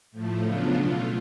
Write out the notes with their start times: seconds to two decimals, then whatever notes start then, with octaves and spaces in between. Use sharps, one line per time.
0.12 A2 F3 A3
0.42 C#3 F#3 B3 D4 F4
0.74 B2 A3 F4